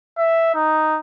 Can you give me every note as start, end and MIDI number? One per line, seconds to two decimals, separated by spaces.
0.18 0.49 76
0.54 0.99 63